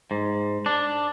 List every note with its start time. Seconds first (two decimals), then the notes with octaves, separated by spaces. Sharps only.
0.11 G#2
0.66 D4